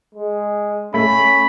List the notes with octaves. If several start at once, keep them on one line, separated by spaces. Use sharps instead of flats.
G#3
A3 C#4 B5